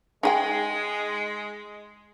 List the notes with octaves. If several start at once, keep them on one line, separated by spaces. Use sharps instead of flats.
G#3 D#4 G#4 G5